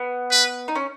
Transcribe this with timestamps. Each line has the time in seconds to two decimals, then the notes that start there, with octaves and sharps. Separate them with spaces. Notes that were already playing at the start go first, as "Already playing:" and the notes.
Already playing: B3
0.31 B4
0.68 D#4
0.75 C#4